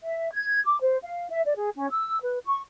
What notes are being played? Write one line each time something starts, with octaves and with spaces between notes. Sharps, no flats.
E5
G#6
D6
C5
F5
E5
D5
G#4
C#4
E6
B4
C#6